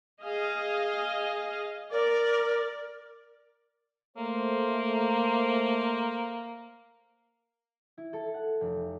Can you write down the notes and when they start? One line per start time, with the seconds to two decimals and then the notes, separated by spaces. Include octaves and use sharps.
0.22 G#4 D#5 F5
1.91 A#4 D5
4.17 A3 A#3 C5
7.98 E4
8.13 A4
8.34 F#5
8.61 F1